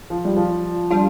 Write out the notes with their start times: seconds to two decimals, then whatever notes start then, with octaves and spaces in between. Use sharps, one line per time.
0.10 F3
0.25 G3
0.37 F3
0.91 G3 D4 F4